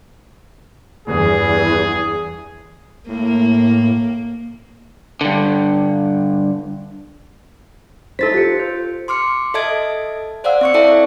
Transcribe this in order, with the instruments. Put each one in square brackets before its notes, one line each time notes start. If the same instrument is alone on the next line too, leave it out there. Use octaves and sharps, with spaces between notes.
[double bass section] E2 G2 E3 [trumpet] G#4
[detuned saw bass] A2 [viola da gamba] A#3
[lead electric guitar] G2 D3
[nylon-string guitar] D#4 E4 C5 [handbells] A4 A6 B6
[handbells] F4 C#7 [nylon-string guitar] G4
[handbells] C5
[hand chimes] C6 D6 F6 C#7
A4 D#5 E5 A5 G#6 D7
C5 D5 F5 F#5 E6
C4 C#6 C#7
E4 A4 D5 E5 G5 A5